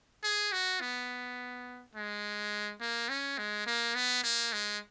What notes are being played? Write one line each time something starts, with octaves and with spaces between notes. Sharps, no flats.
G#4
F#4
B3
G#3
A#3
C#4
G#3
A#3
B3
A#3
G#3